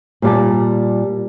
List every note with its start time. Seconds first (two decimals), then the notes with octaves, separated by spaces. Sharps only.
0.22 A#2 G3 A5